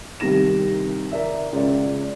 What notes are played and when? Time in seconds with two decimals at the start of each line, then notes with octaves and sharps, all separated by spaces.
0.20 C2 C3 D#3 A#6 E7
1.11 A#4 D5 E5
1.53 C#2 D5